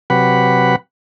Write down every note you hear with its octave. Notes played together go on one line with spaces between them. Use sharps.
C3 F#3 G4 B4 F#5 B5